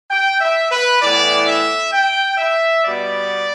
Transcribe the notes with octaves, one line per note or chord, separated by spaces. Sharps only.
G5
E5
B4
A2 E3 B3 D5
E5
G5
E5
B2 G3 B3 D5